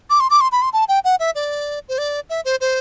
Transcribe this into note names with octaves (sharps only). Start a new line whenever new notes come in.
D6
C6
D6
C6
B5
C6
A5
G5
F#5
E5
D5
C5
D5
E5
C5
C5